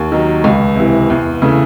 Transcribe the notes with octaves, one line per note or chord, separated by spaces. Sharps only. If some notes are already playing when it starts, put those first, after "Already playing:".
Already playing: D#2
D#3 F#3
C#2
C3 E3
E2
C#3 E3 A3